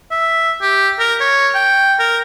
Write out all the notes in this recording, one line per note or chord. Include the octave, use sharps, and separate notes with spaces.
E5
G4
A#4
C#5
G5
A#4